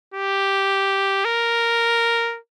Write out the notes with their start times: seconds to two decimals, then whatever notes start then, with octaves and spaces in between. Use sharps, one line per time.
0.14 G4
1.25 A#4